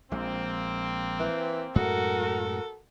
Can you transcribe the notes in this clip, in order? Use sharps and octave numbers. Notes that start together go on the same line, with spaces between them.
A#1 G#3 A#3 C4
E3
F#2 A2 G#3 F#4 A4 A#4